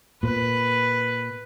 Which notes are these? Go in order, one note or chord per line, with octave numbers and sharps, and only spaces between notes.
A#2 B4